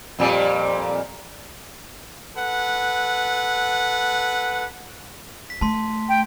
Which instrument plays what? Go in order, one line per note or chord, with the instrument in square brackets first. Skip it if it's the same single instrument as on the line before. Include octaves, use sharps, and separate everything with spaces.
[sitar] F2 A#2 G3
[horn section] A4 B4 F#5
[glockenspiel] B6
[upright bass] A3 [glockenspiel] A5 C6
[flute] G5